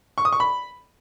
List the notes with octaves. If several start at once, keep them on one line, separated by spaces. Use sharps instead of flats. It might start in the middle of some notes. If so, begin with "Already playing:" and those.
C#6
D#6
C#6
B5